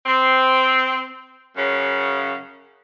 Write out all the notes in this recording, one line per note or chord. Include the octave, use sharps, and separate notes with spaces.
C4
F#2 C#3